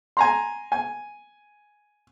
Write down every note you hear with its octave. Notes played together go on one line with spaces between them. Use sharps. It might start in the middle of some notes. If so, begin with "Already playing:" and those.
G#5 A#5 C6
G#5